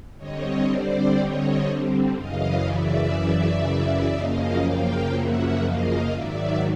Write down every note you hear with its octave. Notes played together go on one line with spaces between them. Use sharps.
D3 G3 C4 C#5 D#5
C5 D5
C#5 D#5
F#2 C#3 E3 D#5 F5
D5 E5
F#2 C#3 F3 A#3 D#5 F5
F5 G5
E5 F#5
D#5 F5
G#2 D#3 F#3 D5 E5